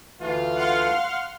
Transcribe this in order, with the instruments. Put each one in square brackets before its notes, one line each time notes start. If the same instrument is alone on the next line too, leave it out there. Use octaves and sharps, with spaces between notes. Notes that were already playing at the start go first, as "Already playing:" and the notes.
[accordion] D2 E3 A3 [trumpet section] F4
[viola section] F5 [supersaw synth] F#5 C6 F6